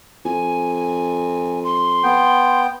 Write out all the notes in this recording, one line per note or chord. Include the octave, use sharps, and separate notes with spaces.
F2 G#5
C6
B3 G5